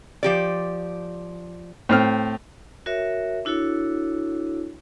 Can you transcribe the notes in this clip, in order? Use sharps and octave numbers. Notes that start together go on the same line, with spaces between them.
F3 G4 D5
A2 C4 F6
F#4 A#4 C#5 E5
D4 E4 F#4 A4 C#5